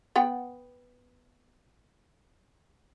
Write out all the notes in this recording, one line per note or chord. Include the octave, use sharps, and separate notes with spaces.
B3 F#5 G5